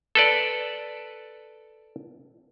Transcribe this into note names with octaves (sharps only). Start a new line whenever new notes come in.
A4 B4 D5